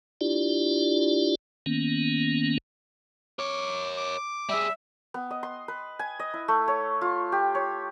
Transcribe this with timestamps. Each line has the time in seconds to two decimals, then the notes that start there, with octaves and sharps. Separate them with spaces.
0.21 D4 E4 F4 G4 D5
1.66 D#3 A#3 B3 C#4
3.39 A#4 C#5 D6
3.97 D6
4.49 G3 G#4 E5
5.14 B3
5.31 D#5
5.43 C6
5.68 B4
5.99 G#5
6.19 D#5
6.34 E4
6.48 A3
6.68 C#5
7.01 F4
7.32 G4
7.55 C#5